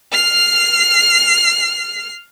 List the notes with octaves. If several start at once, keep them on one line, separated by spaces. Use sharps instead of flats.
F6 C7